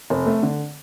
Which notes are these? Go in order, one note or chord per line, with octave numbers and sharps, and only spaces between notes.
F1
A3
D3